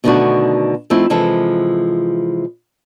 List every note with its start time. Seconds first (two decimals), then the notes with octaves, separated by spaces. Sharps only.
0.04 B2 D3 D#3 A3 D4 F#4
0.90 F3 A3 C4 D#4 E4
1.10 C3 E3 F3 G#3 A4